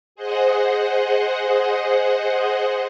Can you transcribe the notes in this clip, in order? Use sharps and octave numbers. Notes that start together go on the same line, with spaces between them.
G#4 C5 D#5 F#5